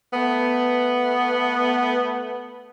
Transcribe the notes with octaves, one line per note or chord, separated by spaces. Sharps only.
A3 B3